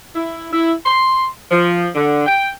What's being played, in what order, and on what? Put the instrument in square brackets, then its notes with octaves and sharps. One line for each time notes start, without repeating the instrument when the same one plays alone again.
[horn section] E4
E4
C6
F3
D3
G5